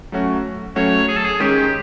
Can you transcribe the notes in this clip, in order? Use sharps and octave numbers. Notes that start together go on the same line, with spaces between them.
F#3 A3 C#4 F#4
F#3 A3 C#4 F#4 C#5
G#4
A4
G#4
D#3 G#3 C#4 G4